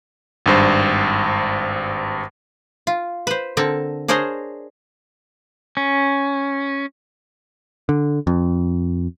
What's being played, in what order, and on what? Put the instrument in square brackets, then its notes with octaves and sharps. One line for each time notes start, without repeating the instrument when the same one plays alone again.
[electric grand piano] G#1 G2 C5
[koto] F4
B4 C5
D3 C4 A4 A#4
D4 G#4 A#4 C5 C#5 D#5
[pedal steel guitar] C#4
[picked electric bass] D3
F2